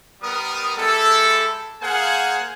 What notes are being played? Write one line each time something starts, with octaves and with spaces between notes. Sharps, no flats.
G3 B3 A#4 D#6
G#3 E4 G4 A4
A#3 G#4 C5 F5 F#5 G#5